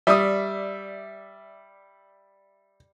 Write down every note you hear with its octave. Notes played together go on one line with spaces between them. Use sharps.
G3 D5 E5 D#6